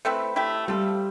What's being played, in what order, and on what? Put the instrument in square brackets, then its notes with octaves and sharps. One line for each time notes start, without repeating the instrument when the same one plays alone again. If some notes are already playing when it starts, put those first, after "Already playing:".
[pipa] A3 C4 E4 B4
A3 E4 G4
[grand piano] G3 [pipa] A3 C4 F4 A4